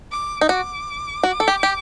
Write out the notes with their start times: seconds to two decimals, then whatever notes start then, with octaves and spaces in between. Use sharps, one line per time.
0.12 D6
0.41 D#4
0.49 F#4 D6
1.23 F#4
1.40 A4
1.48 G4
1.63 G4